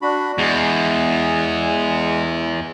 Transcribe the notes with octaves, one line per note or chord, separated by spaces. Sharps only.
D4 F#4 B5
E2 G#3